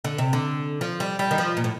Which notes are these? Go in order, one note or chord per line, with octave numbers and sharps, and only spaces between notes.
D3
C3
D3
F3
G3
G3
D#3
F3
A#2
A2